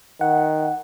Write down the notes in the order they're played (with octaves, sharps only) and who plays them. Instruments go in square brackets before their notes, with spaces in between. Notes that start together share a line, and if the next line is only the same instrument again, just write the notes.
[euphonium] D#3 [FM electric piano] F#5